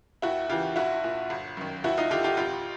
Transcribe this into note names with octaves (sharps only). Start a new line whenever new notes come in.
D#2 E4 F#4
C#3 E3 F4 G4
A#1 E4 F#4
A#2
G1
F#2 D#3
D#2 E4 F#4
D#4 F4
D3 F4 G4
F4 G4
A1 F4 G4